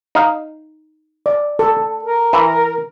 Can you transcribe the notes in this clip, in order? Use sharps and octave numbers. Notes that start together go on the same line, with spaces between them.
D#4 F5
D5
A4
A#4
E3